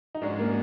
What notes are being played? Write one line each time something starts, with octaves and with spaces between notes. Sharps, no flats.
D#4
G#2 F3 G#3 C#4 D4 F#4
A#3